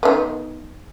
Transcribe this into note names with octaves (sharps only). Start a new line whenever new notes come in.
D#3 B3